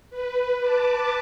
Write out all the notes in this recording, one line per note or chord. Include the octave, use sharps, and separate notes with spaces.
B4
A5 D6